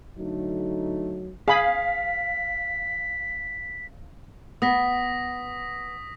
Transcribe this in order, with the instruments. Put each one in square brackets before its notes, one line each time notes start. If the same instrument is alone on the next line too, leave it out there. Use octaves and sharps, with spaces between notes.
[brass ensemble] D3 A3 D#4 [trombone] F#3
[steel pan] G#4 B5 [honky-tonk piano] F5 [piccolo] B6
[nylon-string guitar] B3 [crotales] D#6 A#6 B6